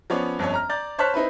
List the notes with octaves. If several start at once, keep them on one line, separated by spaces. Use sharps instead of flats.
F3 B3 C#4 C#5 D5
G1 F2 C#4 C#5
A#5 F6
D5 A#5 G6 A6
C5 C#5 A5 F6 F#6 B6
C4 D#4 E4 B4